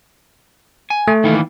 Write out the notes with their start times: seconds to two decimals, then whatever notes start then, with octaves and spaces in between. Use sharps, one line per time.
0.90 G#5
1.08 A3
1.24 D#3 E3 A#3